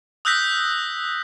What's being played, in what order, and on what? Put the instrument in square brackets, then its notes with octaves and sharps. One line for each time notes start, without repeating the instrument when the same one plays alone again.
[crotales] D#6 E6 F#6 G6 A#6 B6